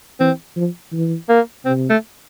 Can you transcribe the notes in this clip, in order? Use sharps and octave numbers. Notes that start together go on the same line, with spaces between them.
E3 C4
F3
E3
A#3
C3 C4
A3